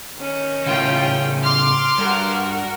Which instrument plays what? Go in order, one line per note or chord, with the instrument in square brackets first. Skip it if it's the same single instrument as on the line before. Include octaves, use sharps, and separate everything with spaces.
[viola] D#3 C#4
[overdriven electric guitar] A2 C#3 [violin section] F4 G5
[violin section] C6 D6 F6
[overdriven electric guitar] G2 [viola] F#4 A#4